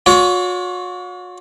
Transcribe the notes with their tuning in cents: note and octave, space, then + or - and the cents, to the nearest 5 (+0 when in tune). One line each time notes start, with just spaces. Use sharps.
F#4 -45 C#5 +35